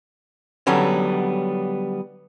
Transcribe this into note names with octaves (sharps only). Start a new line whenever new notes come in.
D3 F#3 G3 B3 C#4